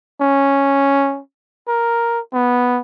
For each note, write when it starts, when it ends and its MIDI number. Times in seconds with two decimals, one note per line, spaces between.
0.21 1.20 61
1.68 2.20 70
2.33 2.81 59